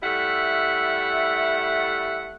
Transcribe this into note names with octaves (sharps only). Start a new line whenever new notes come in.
G3 A3 E4 E5 F#5